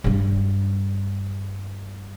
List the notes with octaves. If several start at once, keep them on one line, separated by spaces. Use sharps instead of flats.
G2 G3